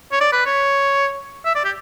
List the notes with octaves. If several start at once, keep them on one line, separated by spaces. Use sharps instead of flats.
C#5
D5
B4
C#5
E5
D5
G4